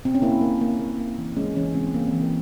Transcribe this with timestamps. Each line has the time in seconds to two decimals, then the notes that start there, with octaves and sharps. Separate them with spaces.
0.05 C4
0.15 C#4
0.22 A#3 E4
0.41 A#3
0.61 A#3
0.79 A#3
0.98 A#3
1.18 E3
1.36 G#3 C#4
1.56 E3 C#4
1.74 G#3 C4
1.94 G#3 A#3
2.08 C4
2.13 E3
2.21 A#3